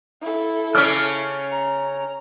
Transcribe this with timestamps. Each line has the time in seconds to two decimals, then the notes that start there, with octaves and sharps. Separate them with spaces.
0.21 E4 A4
0.75 C#3 C#4 A5 D6 F6
1.51 A#5